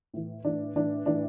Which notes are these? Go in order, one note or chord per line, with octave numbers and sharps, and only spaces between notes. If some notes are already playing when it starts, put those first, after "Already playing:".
A2 E3
A2 E3 D4
A2 E3 D4
A2 E3 D4